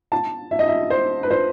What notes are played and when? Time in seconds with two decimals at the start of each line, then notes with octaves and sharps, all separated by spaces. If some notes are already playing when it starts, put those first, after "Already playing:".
0.12 A5
0.51 E5
0.59 D#5
0.68 E5
0.90 C5
1.23 B4
1.31 C5